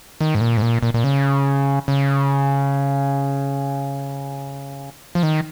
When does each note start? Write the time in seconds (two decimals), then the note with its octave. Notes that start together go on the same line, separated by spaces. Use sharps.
0.21 D#3
0.35 G#2
0.41 A#2
0.57 G#2
0.62 A#2
0.83 A#2
0.94 A#2
1.04 C#3
1.88 C#3
5.15 F3
5.23 D#3